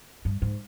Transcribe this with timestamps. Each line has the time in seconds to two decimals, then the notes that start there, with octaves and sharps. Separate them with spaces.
0.25 G2
0.42 G#2